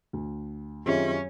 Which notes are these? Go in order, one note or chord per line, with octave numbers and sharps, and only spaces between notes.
D2
F#2 D#3 C4 C#4 F4 G4 G#4 E5